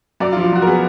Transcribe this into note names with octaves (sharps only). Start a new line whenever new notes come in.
F#2 D5
F4
F3
F4
F#2 F#4
A#4
B3 G#4